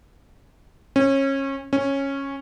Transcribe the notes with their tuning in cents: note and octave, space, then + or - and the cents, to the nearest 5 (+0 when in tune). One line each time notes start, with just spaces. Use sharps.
C#4 -25
C#4 -10